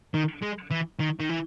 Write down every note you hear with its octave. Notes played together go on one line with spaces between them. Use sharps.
D#3
G#3
E3
D#3
D#3
E3